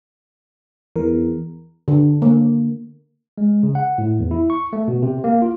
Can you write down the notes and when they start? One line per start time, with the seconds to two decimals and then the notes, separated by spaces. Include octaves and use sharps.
0.96 E2 E3 A#4
1.88 D3
2.22 A#3
3.38 G#3
3.63 C#3
3.75 F#5
3.98 A2
4.19 E2
4.31 E4
4.50 C#6
4.73 A3
4.88 B2
5.03 C3
5.24 A#3
5.42 F4